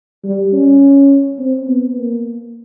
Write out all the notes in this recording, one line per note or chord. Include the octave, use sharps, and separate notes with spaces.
G3
C#4
C4
B3
A#3